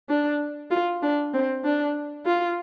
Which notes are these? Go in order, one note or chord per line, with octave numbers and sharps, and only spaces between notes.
D4
F4
D4
C4
D4
F4